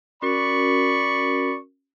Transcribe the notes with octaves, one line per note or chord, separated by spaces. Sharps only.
C#4 F#4 A#4 D5 B5 C#6